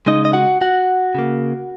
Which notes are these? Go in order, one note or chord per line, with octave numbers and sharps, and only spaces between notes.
C#3 G#3 D#4 D#5
D#5
F#4 F#5
F#4 F#5
C#3 A#3